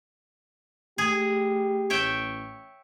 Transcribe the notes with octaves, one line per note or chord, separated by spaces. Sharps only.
A3 G4 G#4
A1 C#5 E5 G5